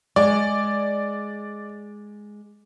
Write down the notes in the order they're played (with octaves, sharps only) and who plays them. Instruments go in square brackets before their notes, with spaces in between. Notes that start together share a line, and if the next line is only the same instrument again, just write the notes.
[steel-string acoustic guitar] G#3 [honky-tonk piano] D5